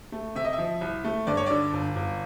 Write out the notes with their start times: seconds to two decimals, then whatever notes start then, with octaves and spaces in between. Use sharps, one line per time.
0.12 A3
0.35 C3 E5
0.45 D#5
0.53 E5
0.58 F3
0.81 C2
1.05 A3
1.27 G2 D5
1.37 C#5
1.46 D3 D5
1.73 G1
1.96 G1